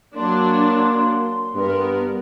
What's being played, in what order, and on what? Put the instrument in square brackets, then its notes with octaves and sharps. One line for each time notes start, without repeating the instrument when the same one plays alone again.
[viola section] F#3 D4 [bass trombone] A#3 [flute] C6
[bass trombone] G2 [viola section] B3 A#4